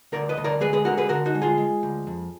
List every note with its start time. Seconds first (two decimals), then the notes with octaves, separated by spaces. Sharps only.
0.12 D2 A#4 D5
0.29 B4 D#5
0.37 D2
0.44 A#4 D5
0.61 G#3 G#4 B4
0.73 G#4 B4
0.85 D3 F#4 A#4
0.97 G#4 B4
1.09 D3 F#4 A#4
1.26 D#4 F#4
1.35 G#3
1.42 F4 G#4
1.58 G#3
1.83 D2
2.07 F2